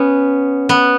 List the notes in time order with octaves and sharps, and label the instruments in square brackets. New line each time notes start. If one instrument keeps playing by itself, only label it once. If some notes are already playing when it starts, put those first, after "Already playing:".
Already playing: [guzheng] B3 C#4
B3